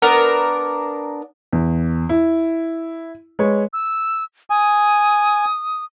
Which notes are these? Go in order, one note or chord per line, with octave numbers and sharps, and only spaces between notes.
B3 D4 A#4
E2
E4
G#3 B4 C#5
E6
G#5 D#6